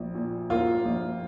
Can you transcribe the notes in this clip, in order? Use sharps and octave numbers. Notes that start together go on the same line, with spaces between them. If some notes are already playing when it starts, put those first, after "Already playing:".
Already playing: A#1
A#2
A#3 F4
A#1